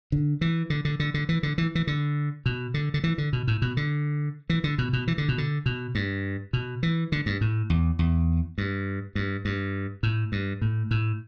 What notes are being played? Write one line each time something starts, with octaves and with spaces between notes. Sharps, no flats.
D3
E3
D3
D3
D3
D3
E3
D3
E3
E3
D3
B2
D3
D3
E3
D3
B2
A2
B2
D3
E3
D3
B2
B2
E3
D3
B2
D3
B2
G2
B2
E3
D3
G2
A2
E2
E2
G2
G2
G2
A2
G2
A2
A2